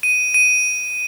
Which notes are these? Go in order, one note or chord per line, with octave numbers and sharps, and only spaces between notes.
D#7
D#7